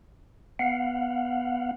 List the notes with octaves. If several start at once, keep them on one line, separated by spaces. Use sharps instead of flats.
B3 F5 F#5